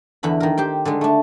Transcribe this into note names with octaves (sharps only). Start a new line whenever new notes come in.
E2 D3 E3 B5
D#3 A#4
G4 C5 G5
D3 G3 G#3
A3 D4